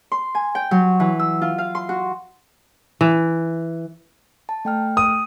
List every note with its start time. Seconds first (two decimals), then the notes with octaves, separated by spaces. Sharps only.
0.12 C6
0.35 G#5
0.55 G5
0.71 F#3
1.00 E3
1.19 E6
1.42 F4
1.58 F5
1.75 C6
1.89 F#4
3.01 E3
4.49 A5
4.65 A3 G5 F6
4.97 D#6